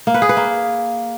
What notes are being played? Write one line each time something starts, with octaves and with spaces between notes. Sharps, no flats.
A#3
B4
G#4
B4
A#3